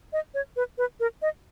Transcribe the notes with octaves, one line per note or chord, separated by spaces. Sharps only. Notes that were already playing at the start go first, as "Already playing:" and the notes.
D#5
C#5
B4
B4
A#4
D#5